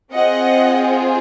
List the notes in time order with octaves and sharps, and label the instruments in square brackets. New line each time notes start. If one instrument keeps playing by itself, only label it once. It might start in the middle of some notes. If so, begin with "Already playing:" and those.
[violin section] C4 F4 G#4 D#5 F#5